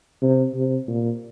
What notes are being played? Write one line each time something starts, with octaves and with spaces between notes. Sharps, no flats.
C3
C3
A#2